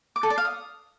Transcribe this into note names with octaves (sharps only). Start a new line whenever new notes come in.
D6
A4
D5
F5
D#6